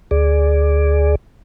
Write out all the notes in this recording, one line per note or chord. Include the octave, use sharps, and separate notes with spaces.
D2 G#4 D5